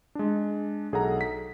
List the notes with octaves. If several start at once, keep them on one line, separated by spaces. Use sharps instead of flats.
G#3 D4
B1 G#4 A4 F#5 A#5
B6